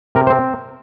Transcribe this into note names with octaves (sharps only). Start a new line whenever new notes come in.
C3 A#4
C5
C4